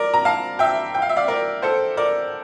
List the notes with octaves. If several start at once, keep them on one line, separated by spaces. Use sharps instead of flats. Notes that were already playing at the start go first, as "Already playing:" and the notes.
Already playing: A#4 D5
A#5
F5 A5
E5 G5
G5
F5
E5
D5 F5
A#4 D5
A4 C5
A#4 D5